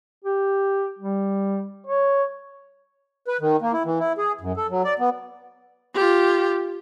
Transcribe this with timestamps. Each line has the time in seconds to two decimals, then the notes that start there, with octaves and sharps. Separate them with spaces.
0.25 G4
0.99 G3
1.87 C#5
3.28 B4
3.41 D#3
3.62 A#3
3.73 E4
3.85 E3
3.99 E4
4.18 G#4
4.41 F#2
4.57 A4
4.70 F#3
4.84 D5
4.99 B3
5.94 F4 G4